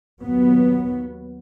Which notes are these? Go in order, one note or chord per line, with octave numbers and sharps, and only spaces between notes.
D#2 F#3 B3